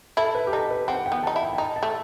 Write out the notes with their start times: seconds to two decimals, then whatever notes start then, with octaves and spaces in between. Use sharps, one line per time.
0.17 E4 A4
0.35 B4
0.47 G4
0.52 D#4 A4
0.70 B4
0.88 C4 F#5
1.06 G5
1.12 B3
1.23 D#4 A5
1.36 E4
1.42 G5
1.53 G5
1.58 D#4 A5
1.76 A5
1.83 A3